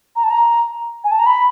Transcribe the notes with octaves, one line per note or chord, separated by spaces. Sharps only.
A#5
A5
A#5
G#5
A5
A#5
B5